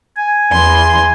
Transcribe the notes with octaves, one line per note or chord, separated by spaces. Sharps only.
G#5
E2 C6